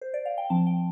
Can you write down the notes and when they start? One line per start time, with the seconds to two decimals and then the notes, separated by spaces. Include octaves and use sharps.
0.01 C5
0.14 D5
0.25 F5
0.38 G5
0.50 F3 C4 A5
0.67 G5